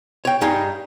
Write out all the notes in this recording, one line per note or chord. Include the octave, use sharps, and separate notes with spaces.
C#5 G5
G2 G3 D#4 F5 G#5